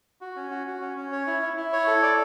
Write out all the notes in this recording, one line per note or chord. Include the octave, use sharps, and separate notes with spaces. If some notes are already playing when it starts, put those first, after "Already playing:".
F#4
C#4
F#4
F#4
C#4
C#4
C#5
E4
E4
E4
C#5
A4
D5